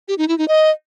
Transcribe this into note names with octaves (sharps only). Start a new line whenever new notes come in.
G4
D#4
E4
D#4
D#5